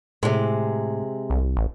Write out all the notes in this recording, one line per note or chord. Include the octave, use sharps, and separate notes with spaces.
A2 C3 G#3
C2
A1